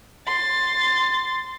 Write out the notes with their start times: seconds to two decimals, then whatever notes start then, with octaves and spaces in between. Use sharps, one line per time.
0.28 C6 A6